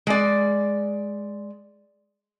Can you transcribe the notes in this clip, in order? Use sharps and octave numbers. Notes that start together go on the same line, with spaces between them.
G#3 D5